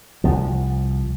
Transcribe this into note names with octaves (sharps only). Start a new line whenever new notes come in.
C2 F3